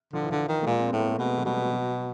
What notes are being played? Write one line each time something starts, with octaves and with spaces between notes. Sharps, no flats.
D3 F3
E3
D3 F3
D#3
A3
A#2 G#3
C4
A2 B3
A#3
A3
B2 G#3
F#3
B2 G3
F#3